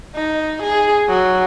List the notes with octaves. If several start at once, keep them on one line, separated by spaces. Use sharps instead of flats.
D#4
G#4
F#3